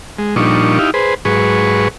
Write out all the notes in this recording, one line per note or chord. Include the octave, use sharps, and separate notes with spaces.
G#3
A#2 F3 G3 D4 D#4 C#6
D#4 E4 G4 F5
G#4 B4 C5
G#2 F#3 G#4 B4 C#6